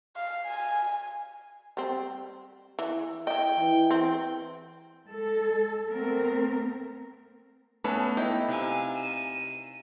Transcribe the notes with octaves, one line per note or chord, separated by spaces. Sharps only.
F5
G#5
G3 C4
E3
E4 D#5 G5
E3
C4
G#3 A4
A3 B3 C4 A#4
A3 B3 C#4 A4 B4
D#4 E4 G5
C3 F5 G#5
D#7 E7